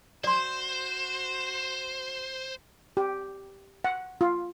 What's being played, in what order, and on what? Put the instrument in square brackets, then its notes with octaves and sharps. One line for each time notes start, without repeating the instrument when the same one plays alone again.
[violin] F#4 E7 [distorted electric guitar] C5 [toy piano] D5 C6
[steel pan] G4
F#5
F4